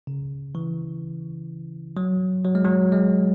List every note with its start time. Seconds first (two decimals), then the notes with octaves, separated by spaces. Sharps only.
0.07 C#3
0.55 E3
1.97 F#3
2.45 F#3
2.55 G#3
2.65 F#3
2.92 G#3